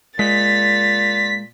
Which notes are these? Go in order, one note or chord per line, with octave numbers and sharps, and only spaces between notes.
A#2 G#3 A6 B6